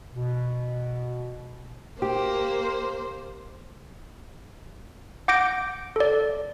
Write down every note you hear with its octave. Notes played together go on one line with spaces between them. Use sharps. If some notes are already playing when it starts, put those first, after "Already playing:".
B2
A#3 G4 C5
F#5 D6 G6 A#6 D7
A4 D5